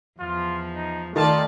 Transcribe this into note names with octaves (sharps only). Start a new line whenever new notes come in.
E2 F3 F4
D#4
D#3 A3 F4 D5 A5